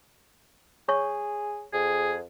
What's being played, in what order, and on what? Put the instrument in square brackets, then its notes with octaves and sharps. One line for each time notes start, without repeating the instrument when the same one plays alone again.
[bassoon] G#4 [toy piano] C#5 C#6
[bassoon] F2 [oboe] G#4